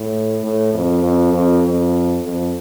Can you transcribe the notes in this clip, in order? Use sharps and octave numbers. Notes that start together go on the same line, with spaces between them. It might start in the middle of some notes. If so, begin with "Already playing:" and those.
Already playing: A2
A2
F2
F2
F2
F2
F2